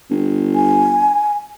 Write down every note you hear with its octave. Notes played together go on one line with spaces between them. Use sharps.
G1
G#5